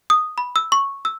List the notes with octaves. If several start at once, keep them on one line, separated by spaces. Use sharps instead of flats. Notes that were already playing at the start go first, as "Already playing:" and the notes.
D#6
B5
E6
C#6
E6